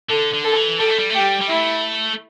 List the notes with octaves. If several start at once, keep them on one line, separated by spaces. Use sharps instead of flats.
D3 A4
D3
A4
E3
G3 A4
A3
G3
A3 G4
G3
G3
A3 E4